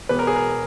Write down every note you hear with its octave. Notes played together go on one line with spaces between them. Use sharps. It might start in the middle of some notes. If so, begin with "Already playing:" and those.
E1 E2 B2 B4
A#4
G#4
A#4